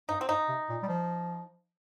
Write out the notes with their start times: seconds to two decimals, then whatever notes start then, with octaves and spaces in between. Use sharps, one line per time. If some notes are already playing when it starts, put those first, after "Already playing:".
0.09 G2 D#4
0.21 C4
0.29 G2 D#4
0.48 C3
0.69 A#2
0.82 G3
0.88 F3